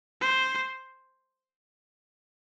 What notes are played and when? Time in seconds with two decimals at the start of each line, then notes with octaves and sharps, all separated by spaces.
0.21 C5